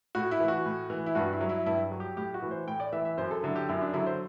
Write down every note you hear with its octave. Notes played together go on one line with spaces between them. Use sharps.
A2 F#4
E4
E3
F#4
A2
E3
E4
G2 F#4
E4
F#3
E4
G2 E4
F#3
G4
A2 G4
F#4
E3
C5
A2 G5
D5
E3 E5
E5
F#2 C5
A4
D3 F#3 E4
G4
F#2 E4
D4
D3 F#3 E4
C5